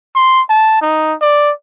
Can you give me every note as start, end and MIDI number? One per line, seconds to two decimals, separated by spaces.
0.15 0.41 84
0.50 0.77 81
0.82 1.14 63
1.21 1.52 74